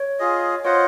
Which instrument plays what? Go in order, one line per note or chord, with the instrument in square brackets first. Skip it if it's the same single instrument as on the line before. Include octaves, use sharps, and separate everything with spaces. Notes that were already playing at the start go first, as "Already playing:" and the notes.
Already playing: [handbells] C#5
[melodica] F4 G#4 D#5
[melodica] F4 C5 D#5 F#5 [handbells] C#5